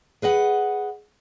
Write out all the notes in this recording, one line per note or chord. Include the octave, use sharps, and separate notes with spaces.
G#4 B4 D#5 F#5